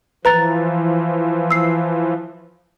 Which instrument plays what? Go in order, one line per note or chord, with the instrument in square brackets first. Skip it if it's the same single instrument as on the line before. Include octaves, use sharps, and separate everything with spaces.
[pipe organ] E3 F3 [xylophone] B4 A#5 A6
[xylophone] E6 C7